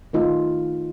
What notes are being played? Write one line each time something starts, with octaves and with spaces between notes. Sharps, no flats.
D#3 A3 D#4 F4